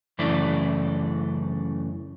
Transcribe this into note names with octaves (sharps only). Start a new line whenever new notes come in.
F#2 C#3 E3 A3 D4